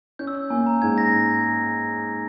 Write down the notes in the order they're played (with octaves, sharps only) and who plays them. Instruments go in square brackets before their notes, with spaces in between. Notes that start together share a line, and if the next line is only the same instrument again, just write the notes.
[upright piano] C#4 [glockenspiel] G6
[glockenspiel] E6
G6
[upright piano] A#3 [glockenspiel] G#5
[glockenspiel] A#5
[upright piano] G#2 [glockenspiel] G#6
[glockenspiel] A#6